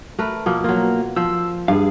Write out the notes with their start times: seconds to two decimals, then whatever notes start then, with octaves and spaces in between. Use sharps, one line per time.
0.19 A3 A#4 B4
0.46 B2 F3 A#3
0.64 F#3 A#3 F4
1.16 F3 C5 E6
1.68 G2 G#4 F5